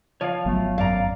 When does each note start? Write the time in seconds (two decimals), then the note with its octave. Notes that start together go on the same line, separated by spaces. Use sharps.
0.21 F3 C#5 D5 F5
0.46 G#1 F#3 A3 B3
0.78 F#2 D5 F5 A#5